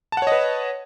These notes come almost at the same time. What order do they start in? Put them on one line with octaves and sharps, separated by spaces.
A5 F#5 C#5 D#5 B4